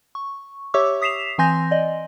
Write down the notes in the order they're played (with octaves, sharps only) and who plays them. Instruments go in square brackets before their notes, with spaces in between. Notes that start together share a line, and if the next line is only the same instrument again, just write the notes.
[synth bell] C#6
G4 C#5 E5 C#6 D6 E6
D#6 B6 C7 E7 F7
E3 C4 G#5 C6 G6 A#6
D5 D#5